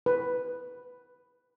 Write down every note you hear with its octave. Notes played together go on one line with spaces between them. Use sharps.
B4